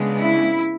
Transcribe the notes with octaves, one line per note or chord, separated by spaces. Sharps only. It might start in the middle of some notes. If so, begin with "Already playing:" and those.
Already playing: C#3 G#3 B3 D4
E4